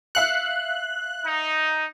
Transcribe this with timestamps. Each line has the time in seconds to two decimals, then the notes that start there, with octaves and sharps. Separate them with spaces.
0.15 E5 F5 F#6 C#7
1.25 D#4